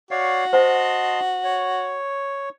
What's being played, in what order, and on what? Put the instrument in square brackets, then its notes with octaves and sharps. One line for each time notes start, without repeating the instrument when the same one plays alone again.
[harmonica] F#4 [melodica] C#5 D5 F5
[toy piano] C5 F#5 [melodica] D#5 A5 C6
[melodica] C#5